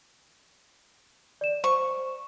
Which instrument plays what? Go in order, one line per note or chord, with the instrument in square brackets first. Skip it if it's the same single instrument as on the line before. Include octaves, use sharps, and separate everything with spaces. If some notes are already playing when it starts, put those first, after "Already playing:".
[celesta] D5 E7
[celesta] C5 [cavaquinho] C#6